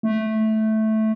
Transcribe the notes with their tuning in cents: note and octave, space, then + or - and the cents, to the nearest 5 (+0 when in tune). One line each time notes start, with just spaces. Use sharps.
A3 -10